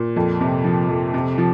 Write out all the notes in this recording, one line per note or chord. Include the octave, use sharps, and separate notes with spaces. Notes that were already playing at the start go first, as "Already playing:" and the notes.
Already playing: A#2
F2
C3
F3
F2
C3
F3